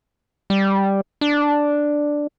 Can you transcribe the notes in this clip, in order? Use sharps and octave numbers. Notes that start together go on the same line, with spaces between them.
G3
D4